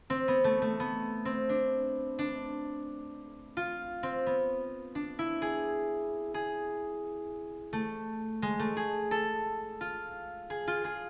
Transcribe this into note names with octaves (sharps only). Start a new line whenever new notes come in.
C4
B3
A3
A3
B3
C4
D4
D4
F4
C4
B3
D4
E4
G#4
G#4
A3
G#3
A3
G#4
A4
F4
G#4
F4
G#4